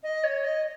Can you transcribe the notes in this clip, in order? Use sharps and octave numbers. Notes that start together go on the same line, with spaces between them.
D#5
C#5
D#5